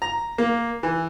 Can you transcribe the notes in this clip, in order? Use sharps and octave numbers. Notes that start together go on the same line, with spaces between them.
A#5
A#3
E3